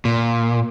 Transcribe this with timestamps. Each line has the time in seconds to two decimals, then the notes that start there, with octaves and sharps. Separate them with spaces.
0.05 A#2